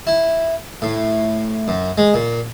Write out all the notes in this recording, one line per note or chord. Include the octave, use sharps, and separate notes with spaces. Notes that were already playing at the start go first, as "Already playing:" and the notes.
E4
A2
F#2
G#3
A#2